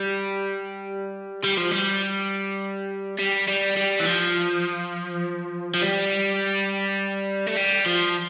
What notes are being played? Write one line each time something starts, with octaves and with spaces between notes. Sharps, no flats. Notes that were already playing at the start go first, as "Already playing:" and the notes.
Already playing: G3
G3
F3
G3
G3
G3
G3
E3
F3
F3
G3
A3
G3
F3